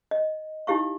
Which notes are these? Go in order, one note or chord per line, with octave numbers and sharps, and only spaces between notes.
D#5
D#4 E4 G4 F5 C#6